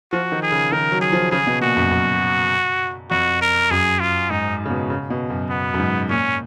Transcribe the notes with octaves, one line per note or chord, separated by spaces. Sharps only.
F3 F#4
D#3
G#4
C#3
D#3 A#4
F#3
G#4
F3
C#3 G#4
B2
A#2 F#4
F#2
F#2
F2 F#4
A#4
F#2 G#4
F4
G#2 D#4
C#3
B2
C#3
B2
F#2
B3
F#2
G#2
A#2 C#4